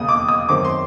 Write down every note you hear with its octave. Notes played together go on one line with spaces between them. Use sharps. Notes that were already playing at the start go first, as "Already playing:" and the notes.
Already playing: E1 D#2 C#3 D#6
D6
D#6
F#2 D#3 G#3 C4 D6
C6